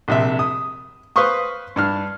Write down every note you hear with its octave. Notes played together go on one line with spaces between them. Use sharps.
A#1 C3 E5
D#6
B4 C5 F5 C6 C#6 D#6
G2 D4 F6